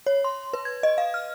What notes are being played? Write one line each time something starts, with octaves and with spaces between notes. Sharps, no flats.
C#5
C6
B4
G#6
D#5
F5
F6